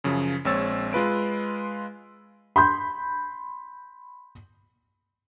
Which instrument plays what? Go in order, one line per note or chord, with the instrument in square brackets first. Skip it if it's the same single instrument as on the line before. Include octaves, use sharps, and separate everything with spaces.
[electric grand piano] F#2 C#3 F3
A#1 G#3 C4 C#5 E6 A6
G#3 F4 B4 D7
[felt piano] B5 C6 G6